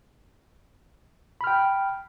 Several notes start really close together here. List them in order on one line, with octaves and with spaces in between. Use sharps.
B5 F6 G5